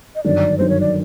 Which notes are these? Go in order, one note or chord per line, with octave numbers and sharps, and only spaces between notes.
D#5
G1 F#2 D#3 D5
G1 F#2 D#3 C5
C#5
D5